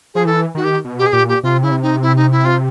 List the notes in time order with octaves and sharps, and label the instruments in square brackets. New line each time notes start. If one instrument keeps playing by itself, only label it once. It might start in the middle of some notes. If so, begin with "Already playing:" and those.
[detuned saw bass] F3 [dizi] G#4
[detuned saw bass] E3 [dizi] A4
[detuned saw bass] D#3 [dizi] F#4
[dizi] G4
[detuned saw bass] B2
[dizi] G4
G#4
[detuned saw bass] A#2 [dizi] G4
[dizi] G4
[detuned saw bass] C3 [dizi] F4
[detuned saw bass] C#3 [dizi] E4
[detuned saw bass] C3
[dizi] D#4
E4
D#4
E4
F4